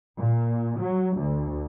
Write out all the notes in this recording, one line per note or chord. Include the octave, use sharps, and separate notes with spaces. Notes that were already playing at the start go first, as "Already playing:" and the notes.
A#2
F#3
D2